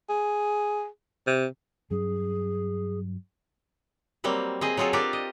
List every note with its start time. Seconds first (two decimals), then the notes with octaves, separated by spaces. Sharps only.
0.09 G#4
1.27 C3
1.91 G2 F#3 C#4 G#4
4.24 F#3 G3 A#3 C4
4.61 C4 G#4 D#5
4.77 F#3 C4 F4 G#4 A4
4.93 D4 F4 G4 A4 A#4 D5
5.13 D#5